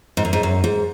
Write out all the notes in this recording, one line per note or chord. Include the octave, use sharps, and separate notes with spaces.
G#2
F#2
G#2
F#2
G#2